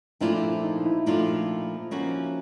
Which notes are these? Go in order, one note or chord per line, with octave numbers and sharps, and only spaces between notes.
A#2 F3 A3 D4 E4 F4
E4
D#4
E4
A#2 F3 A3 D4 F4
F3 A#3 C#4 F#4